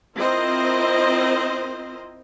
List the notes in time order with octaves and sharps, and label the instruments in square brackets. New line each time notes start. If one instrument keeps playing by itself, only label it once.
[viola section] C4 E4 F4 A#4 C5 D#5